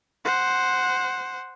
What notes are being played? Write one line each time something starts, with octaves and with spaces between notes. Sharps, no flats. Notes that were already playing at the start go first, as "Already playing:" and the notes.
C5 F#5